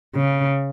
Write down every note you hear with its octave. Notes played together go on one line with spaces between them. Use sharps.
C#3